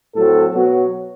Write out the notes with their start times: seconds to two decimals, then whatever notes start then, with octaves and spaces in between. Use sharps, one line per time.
0.15 A2 F#3 C4 A4
0.54 B2 F#3 B3 F#4